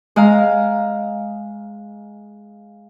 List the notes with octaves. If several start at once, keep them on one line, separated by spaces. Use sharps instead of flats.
G#3 F5 A#5